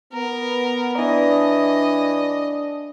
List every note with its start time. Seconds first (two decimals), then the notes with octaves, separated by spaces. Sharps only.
0.13 B3 A#4
0.98 E3 D4 D#5